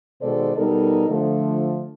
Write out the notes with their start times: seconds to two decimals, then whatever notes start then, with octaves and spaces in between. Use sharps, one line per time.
0.21 B2 D#3 G#3 A4 C5 D5
0.57 B2 G3 B3 D#4 A4 A#4
1.09 D3 F3 A3